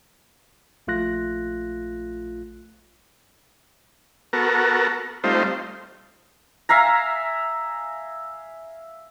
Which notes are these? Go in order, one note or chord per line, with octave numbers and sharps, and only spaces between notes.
A#1 A3 F4 F#6 A#6
B3 F#4 A4 A#4
G3 A3 C4 D#4 F4 C5
E5 F5 G#5 A#5